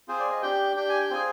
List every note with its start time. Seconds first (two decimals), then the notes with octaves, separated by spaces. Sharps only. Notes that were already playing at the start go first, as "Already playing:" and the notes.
0.08 C4 F4 G#4 C5
0.20 D5
0.32 D#5
0.42 D4 G4 G5
0.76 D4 G4 G5
0.89 G#5
1.00 G5
1.10 C4 F4 G#4 G#5